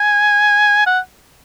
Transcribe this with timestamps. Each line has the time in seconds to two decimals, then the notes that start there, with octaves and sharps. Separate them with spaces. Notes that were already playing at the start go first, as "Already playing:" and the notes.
Already playing: G#5
0.86 F#5